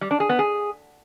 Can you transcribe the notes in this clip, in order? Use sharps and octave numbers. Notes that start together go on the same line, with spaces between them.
G3
D4
G#4
B3
G#4